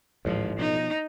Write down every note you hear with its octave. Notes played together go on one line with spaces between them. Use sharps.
A1 D2 G#2 D#3 F3
B2 F3 D#4